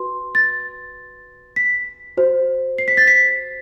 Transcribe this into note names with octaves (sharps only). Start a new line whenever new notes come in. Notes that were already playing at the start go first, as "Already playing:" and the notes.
Already playing: F#4 B4 C6
A6
B6
F#4 C5
C7
B6
A6
B6